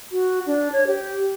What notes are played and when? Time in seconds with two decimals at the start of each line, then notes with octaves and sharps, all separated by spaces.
0.12 F#4
0.46 D4
0.72 C#5
0.87 G4